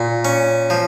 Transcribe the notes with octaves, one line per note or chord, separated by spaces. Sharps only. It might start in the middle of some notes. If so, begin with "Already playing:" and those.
Already playing: A#2
C#4
F3